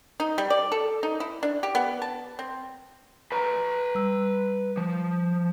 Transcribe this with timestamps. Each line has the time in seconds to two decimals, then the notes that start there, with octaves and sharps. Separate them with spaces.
0.20 D#4
0.38 G3
0.50 D5
0.72 A4
1.03 D#4
1.20 E4
1.43 D4
1.63 G4
1.75 B3
2.02 A5
2.39 C4
3.32 B4 A#5
3.95 G3 E6
4.77 F3